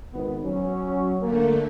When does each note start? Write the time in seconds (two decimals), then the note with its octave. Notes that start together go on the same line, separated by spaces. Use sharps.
0.13 G#1 B3
0.45 F#3 C#4
1.21 D3 A3 A#3